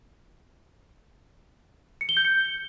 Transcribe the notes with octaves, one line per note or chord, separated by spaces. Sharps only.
C#7
G7
G6
C#7